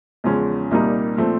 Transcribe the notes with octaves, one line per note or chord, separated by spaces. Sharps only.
E2 C#3 F3 G#3 C#4
C2 A#2 G3 A#3 D#4
A#2 F3 A3 C4